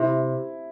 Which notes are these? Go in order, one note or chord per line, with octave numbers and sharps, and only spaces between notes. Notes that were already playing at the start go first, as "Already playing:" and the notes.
Already playing: C3 E4